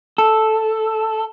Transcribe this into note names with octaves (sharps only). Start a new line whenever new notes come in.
A4